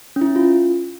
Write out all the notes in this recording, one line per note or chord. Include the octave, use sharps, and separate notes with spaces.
C#4
E4
F4